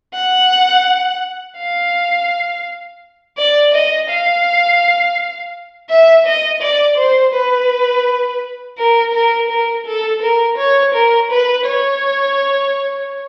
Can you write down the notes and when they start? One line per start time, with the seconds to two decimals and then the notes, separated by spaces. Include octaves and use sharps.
0.14 F#5
1.58 F5
3.38 D5
3.74 D#5
4.10 F5
5.90 E5
6.26 D#5
6.62 D5
6.98 C5
7.34 B4
8.78 A#4
9.14 A#4
9.50 A#4
9.86 A4
10.22 A#4
10.58 C#5
10.94 A#4
11.31 B4
11.66 C#5